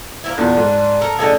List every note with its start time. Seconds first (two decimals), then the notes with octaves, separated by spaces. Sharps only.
0.24 A#3 C4 E4
0.38 E2 A#2 D4
0.57 G#2
1.01 A4 A#4
1.19 A1 D3 D#4 G#4 A4 A#6